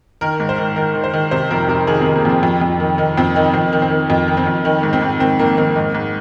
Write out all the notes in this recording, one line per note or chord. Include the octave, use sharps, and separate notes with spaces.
D#3 A#4
G#2
C5
D#3
D#3 A#4
D#3
C5
D#3
C3 C5
F2 A#4
C3 A#4
D#3 G#4
C4
D#3
A#3
F2 C4
F2
F2
D#3
D#3 D#4
F2 C4
D#3 D#4
F2 C4
D#3
C4
D#3
F2 D#4
D#3
C4
F2
D#3 D#4
G#2
C4
G#2
D#3 C4
D#3 A#3
D#3 C4
G#2 D#4
G#2